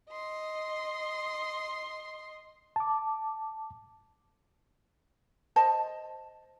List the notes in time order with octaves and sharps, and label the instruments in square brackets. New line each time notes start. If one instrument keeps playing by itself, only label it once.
[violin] D#5 C6
[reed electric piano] A5 D6
[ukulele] C5 D#5 A5